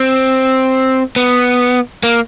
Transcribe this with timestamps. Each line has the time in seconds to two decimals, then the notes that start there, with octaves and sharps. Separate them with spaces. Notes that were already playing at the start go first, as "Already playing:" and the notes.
Already playing: C4
1.16 B3
2.03 A#3